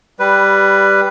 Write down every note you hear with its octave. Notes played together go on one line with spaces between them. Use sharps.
G3 B4